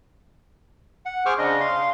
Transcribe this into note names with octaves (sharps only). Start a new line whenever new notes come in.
F#5
G#4 C5 C#6 D6 F6
C#3 D4 D#5
F5 C6